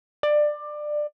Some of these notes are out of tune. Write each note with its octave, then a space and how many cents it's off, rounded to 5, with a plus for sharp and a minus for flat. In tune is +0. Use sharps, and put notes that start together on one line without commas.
D5 +20